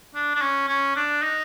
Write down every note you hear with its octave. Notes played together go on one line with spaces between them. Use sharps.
D4
D4
C#4
C#4
D4
D#4